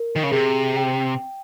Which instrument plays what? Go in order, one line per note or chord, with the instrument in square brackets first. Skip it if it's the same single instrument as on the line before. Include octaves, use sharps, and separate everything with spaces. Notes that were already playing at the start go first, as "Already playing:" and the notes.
Already playing: [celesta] A#4
[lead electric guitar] D#3
C#3
[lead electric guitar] C3 [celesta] G#4
[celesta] G5